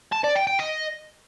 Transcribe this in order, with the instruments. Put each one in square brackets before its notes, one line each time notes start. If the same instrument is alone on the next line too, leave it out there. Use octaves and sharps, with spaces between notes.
[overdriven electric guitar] A5
D5
G5
G5
D#5